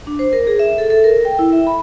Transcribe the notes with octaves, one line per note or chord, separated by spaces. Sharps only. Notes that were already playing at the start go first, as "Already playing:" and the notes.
D4
C5
A#4
G#4
E5
A4
A4
A#4
G5
E4
E5
B5